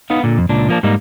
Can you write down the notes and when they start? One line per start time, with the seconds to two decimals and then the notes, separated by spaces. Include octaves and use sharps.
0.10 B3 D#4 F5
0.23 A#2 D3
0.38 F2
0.49 C#2 A#2 D4
0.69 F3 A#3 D4
0.83 G#2 G3 A#3 D#4